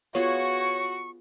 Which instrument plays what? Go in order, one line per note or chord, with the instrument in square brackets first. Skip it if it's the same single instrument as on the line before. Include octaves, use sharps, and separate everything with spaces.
[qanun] B3 F4 G#4 [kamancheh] F#4 [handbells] C#5 [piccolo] C#6